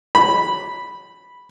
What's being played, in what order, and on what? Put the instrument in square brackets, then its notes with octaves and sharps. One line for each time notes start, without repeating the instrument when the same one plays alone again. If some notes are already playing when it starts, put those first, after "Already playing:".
[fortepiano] B5